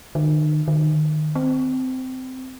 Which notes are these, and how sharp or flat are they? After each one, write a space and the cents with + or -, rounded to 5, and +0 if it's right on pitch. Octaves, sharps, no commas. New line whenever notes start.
D#3 -40
D#3 -25
C4 -20